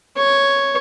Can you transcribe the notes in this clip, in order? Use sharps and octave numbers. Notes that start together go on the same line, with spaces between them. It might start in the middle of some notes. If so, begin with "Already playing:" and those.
C#5